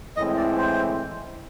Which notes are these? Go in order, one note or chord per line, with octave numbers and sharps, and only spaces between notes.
A2 E3 G#3 C4 E4 D#5
D5
C5